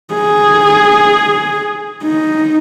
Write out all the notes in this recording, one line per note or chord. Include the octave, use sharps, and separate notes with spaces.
G#4
D#4